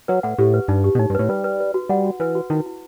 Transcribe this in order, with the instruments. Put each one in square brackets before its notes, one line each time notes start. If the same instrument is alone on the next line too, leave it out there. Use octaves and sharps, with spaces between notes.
[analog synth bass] F#3 [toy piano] B4
[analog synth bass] A2 [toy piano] F#5
[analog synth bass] A2 [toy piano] G4
[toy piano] B4
[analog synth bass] G2 [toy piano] D#4
[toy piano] G4
[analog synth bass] B2
[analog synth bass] A2 [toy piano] D#4
[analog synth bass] G2
[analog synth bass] A2 [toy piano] B4
[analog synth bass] G3 [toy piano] B4
[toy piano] B4
B4
F#4
[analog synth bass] G3 [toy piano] F#5
[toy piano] F#4
[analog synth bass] E3 [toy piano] B4
[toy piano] F#4
[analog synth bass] D#3 [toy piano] E4
[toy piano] E4